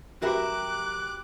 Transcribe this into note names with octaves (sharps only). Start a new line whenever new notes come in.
F#2 F#4 G4 A#4 B4 E5 D6 F#6